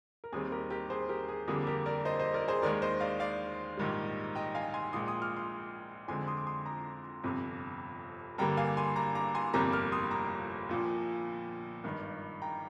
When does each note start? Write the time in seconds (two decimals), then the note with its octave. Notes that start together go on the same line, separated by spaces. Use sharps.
0.24 A#4
0.32 D#2 D#3 G3 C4 G#4
0.52 G4 A#4
0.70 G4 A#4
0.90 G#4 C5
1.09 G4 A#4
1.29 G#4
1.48 F2 D3 G3 A#3 G#4
1.67 G4 A#4
1.86 A#4 D5
2.05 C5 D#5
2.19 C5 D#5
2.34 A#4 D5
2.48 G#4 C5
2.62 D#2 D#3 G#3 A#4 D5
2.82 C5 D#5
3.01 D5 F5
3.20 D5 F5
3.77 A#1 G#2 D#3 G3
4.35 D#5 G5
4.55 F5 G#5
4.74 G#5 C6
4.93 A#1 A#2 G#3 C6 D#6
5.08 C6 D#6
5.22 D6 F6
5.36 C6 D#6
6.08 F2 D3 G#3 C4 G#5 C6
6.27 C6 D#6
6.37 D6
6.47 C6 D#6
6.66 A#5 D6
7.24 G1 F2 C3
8.38 G2 D3 G3 A#3 G5 A#5
8.57 F5 G#5
8.77 G#5 C6
8.96 A#5 D6
9.15 A#5 D6
9.35 G#5 C6
9.53 G1 F2 C3 G3 A#3 A#5 D6
9.72 D6 F6
9.92 C6 D#6
10.11 A#5 D6
10.69 A#1 A#2 F3
11.84 G#1 G2 D#3
12.42 G5 A#5